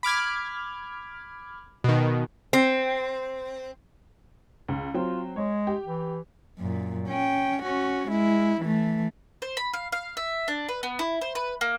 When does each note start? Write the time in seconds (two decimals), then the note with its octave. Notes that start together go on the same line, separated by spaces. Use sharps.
0.03 B5 D6 F6 G#6
1.84 B2 D#3
2.53 C4
4.68 C#2
4.94 F#3 C4 F4
5.36 G#3 C#5
5.67 G4
5.86 E3
6.59 F#2 A#2
7.08 C#4 G5
7.63 C#4 F#4
8.09 G#3 E4
8.61 E3 A3
9.42 C5
9.57 B5
9.73 F5
9.92 F5
10.17 E5
10.48 D4
10.69 B4
10.83 B3
10.99 E4
11.21 C5
11.35 B4
11.61 A#3